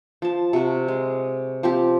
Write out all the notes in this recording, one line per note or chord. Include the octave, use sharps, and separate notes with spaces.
F3 A5
C3 F#4
G#3
F3 C4 G4